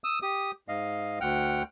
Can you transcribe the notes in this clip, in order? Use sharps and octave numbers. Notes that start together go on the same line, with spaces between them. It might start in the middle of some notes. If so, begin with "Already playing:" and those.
D#6 E6
G4 D#6
G#2 D#5 F5
D2 F#5 G5 F6